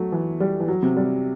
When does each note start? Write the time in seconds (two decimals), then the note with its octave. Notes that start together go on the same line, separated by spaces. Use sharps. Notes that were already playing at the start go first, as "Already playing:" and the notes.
Already playing: F#3 A3
0.12 E3
0.40 G3
0.60 E3
0.68 F#3
0.83 C3
0.97 G3